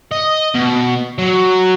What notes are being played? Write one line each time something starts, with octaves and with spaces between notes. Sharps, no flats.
D#5
B2
F#3